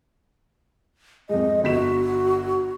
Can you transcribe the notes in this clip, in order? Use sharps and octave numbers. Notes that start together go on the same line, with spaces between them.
F2 G#3 D#5
G1 F#4 B6 E7